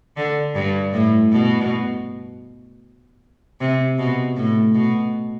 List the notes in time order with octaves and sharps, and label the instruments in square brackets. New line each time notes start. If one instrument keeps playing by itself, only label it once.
[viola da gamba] D3
G2
A2
B2
C3
B2
A2
B2